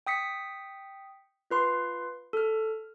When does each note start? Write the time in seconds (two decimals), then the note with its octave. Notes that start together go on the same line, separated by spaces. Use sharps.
0.07 G5 D#6 B6 C#7
1.51 F4 B4 C6
2.33 A4 F6